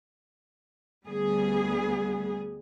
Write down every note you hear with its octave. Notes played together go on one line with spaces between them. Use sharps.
D2 G3 B3 G#4